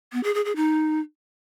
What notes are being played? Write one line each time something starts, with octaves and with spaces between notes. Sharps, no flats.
B3
G#4
G#4
G#4
D#4